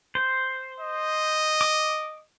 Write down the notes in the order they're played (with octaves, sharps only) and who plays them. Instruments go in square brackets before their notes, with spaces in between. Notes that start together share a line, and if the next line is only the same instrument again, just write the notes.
[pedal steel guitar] C5
[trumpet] D#5
[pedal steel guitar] D6